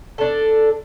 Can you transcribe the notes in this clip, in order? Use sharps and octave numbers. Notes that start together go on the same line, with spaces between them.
D4 A4